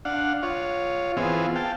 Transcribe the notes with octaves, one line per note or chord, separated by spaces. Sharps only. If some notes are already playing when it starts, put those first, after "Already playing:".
D4 F5 F#5
F4 C#5
E3 B3 C4 F4 G#4
F5 G5 A5